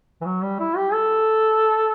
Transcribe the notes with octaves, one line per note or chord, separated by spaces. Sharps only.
E3
F#3
G3
E4
G4
A4